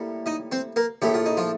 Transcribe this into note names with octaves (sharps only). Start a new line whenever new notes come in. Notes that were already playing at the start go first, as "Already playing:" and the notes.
Already playing: A2 G3 A#3
D#4 D#5
C4 C5
A#3 A#4
A#1 A2 A3 G4
F4
D#4
F3 F4